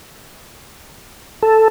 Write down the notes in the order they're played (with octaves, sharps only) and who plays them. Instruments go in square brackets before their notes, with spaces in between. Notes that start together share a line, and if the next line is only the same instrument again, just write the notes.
[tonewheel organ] A4